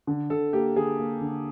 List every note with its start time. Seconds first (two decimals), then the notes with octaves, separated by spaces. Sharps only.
0.07 D3
0.30 D3 A4
0.53 A#3 G4
0.76 D3 G#4
0.99 A#3
1.21 D3